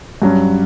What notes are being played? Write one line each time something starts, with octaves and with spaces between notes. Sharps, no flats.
G2 F#3 C#4